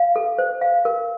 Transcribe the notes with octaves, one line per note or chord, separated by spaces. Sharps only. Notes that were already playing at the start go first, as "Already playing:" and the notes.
Already playing: F5
A4
C5
F5
A#4